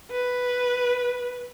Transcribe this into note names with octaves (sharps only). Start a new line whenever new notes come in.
B4